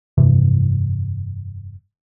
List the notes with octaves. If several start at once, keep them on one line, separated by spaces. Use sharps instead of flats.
F1 G2 C3 E3